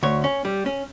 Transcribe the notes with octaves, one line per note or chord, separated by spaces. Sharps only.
D2 C#5
C#4
G3
C#4